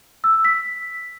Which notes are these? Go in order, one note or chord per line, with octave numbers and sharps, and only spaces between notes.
E6
E6
B6